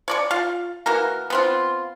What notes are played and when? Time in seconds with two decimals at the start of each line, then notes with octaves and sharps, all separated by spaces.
0.08 C#5 D5 C#6
0.31 F4 F5
0.86 E3 A#3 F#4 A#4
1.30 B3 C4 F4